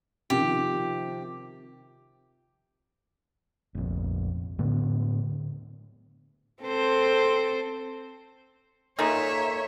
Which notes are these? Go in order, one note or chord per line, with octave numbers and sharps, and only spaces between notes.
C3 D#3 F3 G4
F1 A#1
A2 D3 B3
C4 A4 C5
A#2 A#3 D#4 F4 G#4 A4 C#5 E5